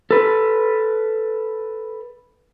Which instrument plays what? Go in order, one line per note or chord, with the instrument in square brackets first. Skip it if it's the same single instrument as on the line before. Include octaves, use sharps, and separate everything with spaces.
[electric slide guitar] A4 B4